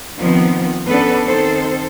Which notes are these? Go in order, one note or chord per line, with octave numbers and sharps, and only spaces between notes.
D#3 F3 B3 C4
B3 C#4 D4 A4 B4
D#3 C4 A4 C5